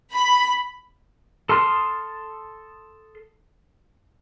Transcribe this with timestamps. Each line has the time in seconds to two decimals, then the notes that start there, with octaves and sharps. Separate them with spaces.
0.14 B5
1.49 A4 A5 C6 D#6 F6